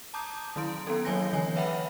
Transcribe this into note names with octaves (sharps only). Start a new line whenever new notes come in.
A5 A#5 D6 D#6 G6
D#3 F#3 E4 C6 D7
B3 C#4 A4
F#3 A#3 C#5 G#5 G6 A#6
D3 E3 C#5 G#5
B4 C#5 E5 F#5 G5 B5